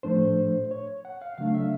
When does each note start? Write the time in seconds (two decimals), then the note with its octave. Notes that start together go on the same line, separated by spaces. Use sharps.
0.03 A2 F3 A3 D4 C5
0.71 C#5
1.05 F#5
1.22 F5
1.38 C#3 F#3 A3 D4 F5
1.54 E5